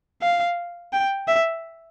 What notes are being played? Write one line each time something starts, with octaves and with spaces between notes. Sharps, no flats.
F5
G5
E5